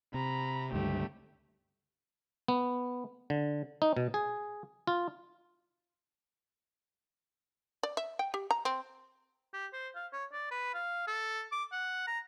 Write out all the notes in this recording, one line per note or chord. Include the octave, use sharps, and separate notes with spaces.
C3 A#5 B5
C#2 G2 D3 A3 G4
B3
D3
D#4
B2
G#4
F4
D5
E5
G5
G4
A#5
C4
G4
C5
F5
C#5
D5
B4
F5
A4
D6
F#5
A#5